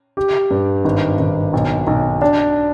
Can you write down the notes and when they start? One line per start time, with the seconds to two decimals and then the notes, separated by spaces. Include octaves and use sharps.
0.17 G4
0.51 G2
0.85 G#1
1.19 G#1
1.53 B1
1.87 B1
2.22 D4